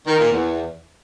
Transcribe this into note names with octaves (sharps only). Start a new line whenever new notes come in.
D#3
A#2
E2